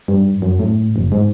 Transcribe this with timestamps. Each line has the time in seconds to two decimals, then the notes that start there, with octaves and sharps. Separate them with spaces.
0.08 G2
0.42 F#2
0.60 A2
0.96 F#1
1.12 G#2